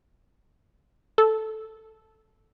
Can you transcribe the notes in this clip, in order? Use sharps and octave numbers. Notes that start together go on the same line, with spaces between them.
A4